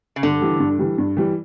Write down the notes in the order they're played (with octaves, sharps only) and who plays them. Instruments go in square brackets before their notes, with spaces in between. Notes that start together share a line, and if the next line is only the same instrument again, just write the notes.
[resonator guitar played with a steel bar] C#3
[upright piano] G2 [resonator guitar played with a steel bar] D3
[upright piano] E3 G3
G2
E3 G3
G2
E3 G3